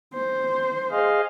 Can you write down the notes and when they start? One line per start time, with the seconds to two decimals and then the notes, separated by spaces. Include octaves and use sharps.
0.13 C5
0.91 G#4 D#5 F5